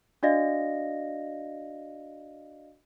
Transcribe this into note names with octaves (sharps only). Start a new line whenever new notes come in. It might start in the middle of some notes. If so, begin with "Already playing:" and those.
D4 F#4 D5 D#5 F5 A#6